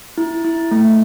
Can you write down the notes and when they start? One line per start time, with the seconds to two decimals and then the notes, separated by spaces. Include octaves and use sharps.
0.18 E4
0.45 E4
0.71 A3